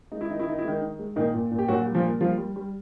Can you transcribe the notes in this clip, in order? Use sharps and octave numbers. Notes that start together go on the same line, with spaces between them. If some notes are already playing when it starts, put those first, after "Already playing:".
G#3 D#4
E4
D#3 D#4
E4
D#3 D#4
E4
D#3 G#3 D#4
D#3
G#3
A#2 D#3 D#4
A#2
A#2
G4
A#2 F#3 F#4
G3
F3 F4
A#3
F3 G3 F4
G3
G3